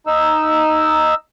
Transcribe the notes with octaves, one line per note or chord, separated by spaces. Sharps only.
D#4 E6